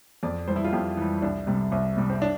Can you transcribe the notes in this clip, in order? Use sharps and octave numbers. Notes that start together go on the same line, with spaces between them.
F2 D5
E3 G3 C5
E4
F4
F2 G4
E3 G3
C2 D4
C3 G3
C2
C3 G3
C4
D4